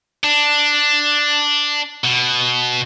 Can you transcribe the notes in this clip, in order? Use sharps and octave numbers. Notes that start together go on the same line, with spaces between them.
D4
B2